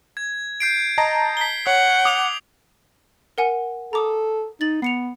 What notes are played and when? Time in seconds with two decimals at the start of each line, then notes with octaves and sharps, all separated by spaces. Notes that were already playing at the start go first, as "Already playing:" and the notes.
0.17 G#6
0.60 G6 C7 D7
0.98 D#5 A5 A#5
1.37 B6 G7
1.67 C#5 F#5
2.05 D6 D#6 F7
3.38 A#4 F#5 G#5
3.93 A4 A#5 D6 D#6
4.61 D#4 A6 F#7
4.82 B3 C7 C#7 F7